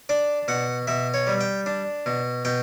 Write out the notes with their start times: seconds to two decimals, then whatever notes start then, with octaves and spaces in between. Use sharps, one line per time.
0.09 D4 D5
0.48 B2 F#5
0.87 B2 E5
1.14 C#5
1.27 G3
1.41 G5
1.66 D4
2.06 B2
2.45 B2 G5